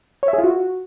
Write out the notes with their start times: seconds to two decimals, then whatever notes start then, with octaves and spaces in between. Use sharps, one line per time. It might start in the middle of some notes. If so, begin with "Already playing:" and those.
0.23 C#5
0.28 E5
0.33 G#4
0.38 F4
0.44 F#4